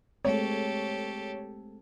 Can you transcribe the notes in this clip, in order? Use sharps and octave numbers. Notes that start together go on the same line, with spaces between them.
G#3 A3 C4 G4 A4 C#5